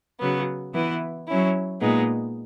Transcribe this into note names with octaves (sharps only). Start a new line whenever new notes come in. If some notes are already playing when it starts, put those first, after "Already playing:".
C#3 F#3 B3
E3 B3 E4
F#3 C#4 E4
A#2 G#3 B3 D#4